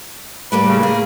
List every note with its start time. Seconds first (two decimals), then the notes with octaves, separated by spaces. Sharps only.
0.52 A2 G3 A#3 B4
0.68 C#3
0.83 A#3 G#4